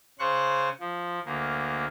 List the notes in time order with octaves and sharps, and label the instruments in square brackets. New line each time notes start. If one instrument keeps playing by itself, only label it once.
[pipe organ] C#3 C5 C#6 F#6
F3
D2 A#3